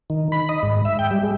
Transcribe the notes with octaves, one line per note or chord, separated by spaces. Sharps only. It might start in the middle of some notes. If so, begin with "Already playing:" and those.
D#3
B5
D#5
G#2
E5
G5
G3
G#3